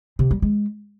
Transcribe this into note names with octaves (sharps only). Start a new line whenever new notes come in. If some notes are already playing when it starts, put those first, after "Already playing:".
C3
G3
G#3